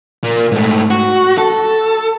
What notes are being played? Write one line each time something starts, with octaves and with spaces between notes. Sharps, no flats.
A#2 A#3
G#2 A3
F#4
A4